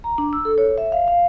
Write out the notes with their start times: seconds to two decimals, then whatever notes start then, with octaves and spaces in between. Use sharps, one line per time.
0.04 A#5
0.18 D4
0.33 E6
0.45 A4
0.58 C#5
0.78 E5
0.92 F5
1.08 F5